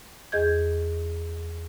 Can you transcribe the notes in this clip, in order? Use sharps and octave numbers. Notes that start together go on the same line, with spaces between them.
E2 G#4 D#5 G6 G#6